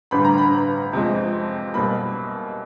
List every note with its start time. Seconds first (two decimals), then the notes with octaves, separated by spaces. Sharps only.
0.11 A1 G2 D3 G3 B5
0.24 A#5
0.38 B5
0.93 F2 C3 F3 G#3
1.73 B1 B2 G3 A#3 B5